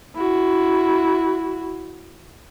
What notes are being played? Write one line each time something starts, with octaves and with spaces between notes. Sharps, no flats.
E4 F#4